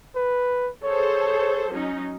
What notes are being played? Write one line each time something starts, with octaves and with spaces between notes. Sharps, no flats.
B4
G#4 A4 C5 C#5
F#3 C#4 D#4